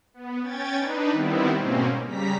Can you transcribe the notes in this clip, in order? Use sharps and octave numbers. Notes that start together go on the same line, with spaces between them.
B3
C#4 G5 G#6 A6
D4 D#4 B4
D#3 G3 B3 C4 E4
G#2 B2 A#3 C4 C#4
C#3 G3 A#5 B6